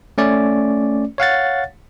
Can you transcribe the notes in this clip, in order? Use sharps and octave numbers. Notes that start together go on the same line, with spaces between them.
A3 C#4 D5
C#5 F5 F#5 A6